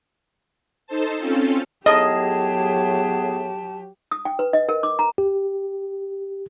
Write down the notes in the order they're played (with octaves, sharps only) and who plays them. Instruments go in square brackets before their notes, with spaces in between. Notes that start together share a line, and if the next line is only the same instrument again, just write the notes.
[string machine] D#4 A4 C5 A5
C4 C#4 F4 A4
[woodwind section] A2 B3 G#4 [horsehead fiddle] F#3 G4 [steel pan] D#5 [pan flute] A5
[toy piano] D#6
G5
B4
D#5
A#4
D6
A#5
[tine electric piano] G4